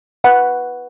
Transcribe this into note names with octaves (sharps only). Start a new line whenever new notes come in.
B4 F#5 B5